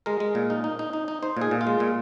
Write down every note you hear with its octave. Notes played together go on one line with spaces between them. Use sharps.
G#3 A#4
G#3
A#2
D#4
D#4
D#4
D#4
D#4
D#4 C5
A#2 G#4
A#2
F4
G#3
A#2